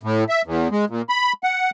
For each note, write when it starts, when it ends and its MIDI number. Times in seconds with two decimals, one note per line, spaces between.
0.03 0.24 45
0.29 0.42 76
0.46 0.68 40
0.71 0.85 56
0.90 1.02 46
1.09 1.33 83
1.43 1.70 78